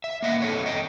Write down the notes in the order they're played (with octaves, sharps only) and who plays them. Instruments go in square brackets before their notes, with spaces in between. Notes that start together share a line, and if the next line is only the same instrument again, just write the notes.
[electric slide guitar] E5
A#3 D#5 F5 F#5
C4 A4 C#5
D#5 G5